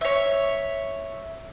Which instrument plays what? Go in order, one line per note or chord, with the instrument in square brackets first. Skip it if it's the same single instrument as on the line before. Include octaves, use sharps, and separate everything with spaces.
[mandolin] C#5 E5